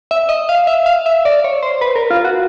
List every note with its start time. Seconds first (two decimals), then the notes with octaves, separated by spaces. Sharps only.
0.11 E5
0.29 D#5
0.49 F5
0.67 E5
0.86 F5
1.06 E5
1.25 D5
1.44 C#5
1.63 C5
1.81 B4
1.96 A#4
2.10 F4
2.25 F#4